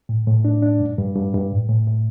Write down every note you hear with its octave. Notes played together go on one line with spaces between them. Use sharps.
A2
A2
D4
D4
G2
G2
G2
G2
A2
A2
A2